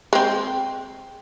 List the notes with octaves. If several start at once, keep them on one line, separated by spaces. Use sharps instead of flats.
G#3 C4